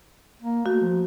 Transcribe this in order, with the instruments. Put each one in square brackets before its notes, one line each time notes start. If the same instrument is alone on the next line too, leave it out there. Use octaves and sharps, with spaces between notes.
[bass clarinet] A#3
[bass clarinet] A3 [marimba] F#4
[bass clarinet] F3